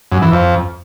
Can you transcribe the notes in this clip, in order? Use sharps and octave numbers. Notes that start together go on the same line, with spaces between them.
F#2
E3
F2